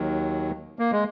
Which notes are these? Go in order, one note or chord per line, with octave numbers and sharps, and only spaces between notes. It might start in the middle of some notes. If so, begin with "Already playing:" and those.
Already playing: D#2 D#3 F#3
A#3
G#3